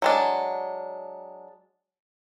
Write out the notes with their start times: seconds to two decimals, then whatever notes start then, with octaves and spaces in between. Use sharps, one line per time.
0.02 F#3 G#3 D4